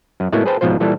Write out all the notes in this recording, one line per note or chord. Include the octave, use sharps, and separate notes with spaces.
F#2
A2 G#3 A#3 B3 E4 F#4
G#4 B4 C5 G5 A5
A#1 G#2 B2 F3 F4 C5
A#2 E3 G3 A4